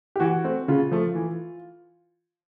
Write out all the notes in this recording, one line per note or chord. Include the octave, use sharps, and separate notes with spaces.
G4
E3 F#4
A3 C4
C#3 F4
F3 A3
E3